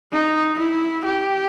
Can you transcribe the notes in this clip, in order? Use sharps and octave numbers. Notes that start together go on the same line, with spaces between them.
D#4
E4
G4